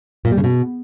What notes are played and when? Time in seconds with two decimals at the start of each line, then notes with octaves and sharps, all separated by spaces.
0.25 A#2
0.31 G3
0.37 C#3
0.44 B2